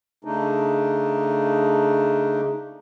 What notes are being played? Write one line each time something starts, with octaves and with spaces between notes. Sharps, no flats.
C#3 A3 D4 D#4